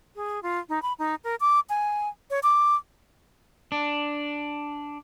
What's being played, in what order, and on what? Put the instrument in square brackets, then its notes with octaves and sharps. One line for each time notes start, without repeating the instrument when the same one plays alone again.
[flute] G#4
F4
D#4
B5
D#4
A#4
D6
G#5
C#5
D6
[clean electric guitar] D4